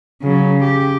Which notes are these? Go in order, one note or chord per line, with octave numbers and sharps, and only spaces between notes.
C#3 F#3
G4